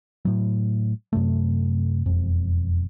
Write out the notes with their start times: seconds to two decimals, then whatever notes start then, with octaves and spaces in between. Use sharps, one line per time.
0.25 A2 F#3
1.13 F#2 C3 A3
2.06 E1 F2